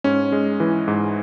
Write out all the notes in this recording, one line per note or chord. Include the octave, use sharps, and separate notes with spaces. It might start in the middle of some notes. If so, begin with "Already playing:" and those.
G#2 C#4
G#3
E3
G#2